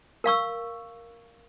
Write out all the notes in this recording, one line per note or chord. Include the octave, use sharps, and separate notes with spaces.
A#4 F5 C#6 E6